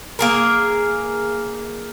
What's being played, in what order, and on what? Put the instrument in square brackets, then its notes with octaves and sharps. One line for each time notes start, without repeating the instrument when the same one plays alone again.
[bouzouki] A#3 G#4 A#4